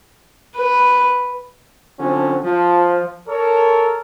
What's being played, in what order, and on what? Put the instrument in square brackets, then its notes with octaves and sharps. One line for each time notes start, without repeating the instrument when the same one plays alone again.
[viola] B4
[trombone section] D3 F3 F#3 C4 C#4
F3
[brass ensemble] A4 A#4 C#5